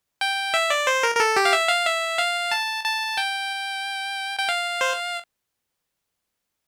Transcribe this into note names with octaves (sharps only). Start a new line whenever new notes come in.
G5
E5
D5
C5
A#4
A#4
A4
G4
F5
E5
F5
E5
F5
A5
A5
G5
G5
F5
C5